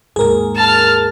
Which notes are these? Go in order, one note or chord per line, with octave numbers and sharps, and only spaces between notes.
D#2 G#2 G#4 A#4
A5 F6